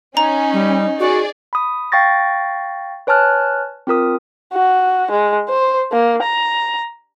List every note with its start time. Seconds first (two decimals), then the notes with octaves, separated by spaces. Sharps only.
0.17 C#4 D#4 A#5
0.53 G3
1.00 F#4 G#4 D5
1.53 B5 D#6
1.92 F5 G5 C#6 A6 A#6
3.07 B4 C#5 G#5 A5 F6 F#6
3.87 C4 F4 A#4 D#6
4.53 F#4
5.12 G#3
5.49 C5
5.92 A#3
6.23 A#5